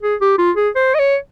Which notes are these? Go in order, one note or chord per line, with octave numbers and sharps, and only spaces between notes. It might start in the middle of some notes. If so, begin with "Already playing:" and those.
G#4
G4
F4
G#4
C5
D#5
C#5